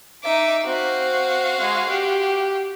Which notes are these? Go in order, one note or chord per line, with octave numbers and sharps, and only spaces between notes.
D#4 E5 D6
C4 F#4 F5
G#3
G4